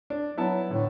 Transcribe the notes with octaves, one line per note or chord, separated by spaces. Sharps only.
D4
F#3 B3 E4 A5
A2 D3